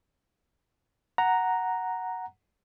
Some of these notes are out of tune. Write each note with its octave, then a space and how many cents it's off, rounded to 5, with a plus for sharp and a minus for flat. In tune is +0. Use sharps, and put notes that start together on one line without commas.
F#5 +0 A#5 +0